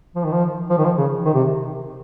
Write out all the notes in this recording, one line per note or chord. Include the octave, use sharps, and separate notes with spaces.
F3
D#3
F3
F3
D#3
F3
C#3
D#3
C3